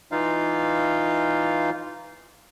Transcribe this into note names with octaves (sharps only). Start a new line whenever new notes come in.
E3 D#4 F4 F5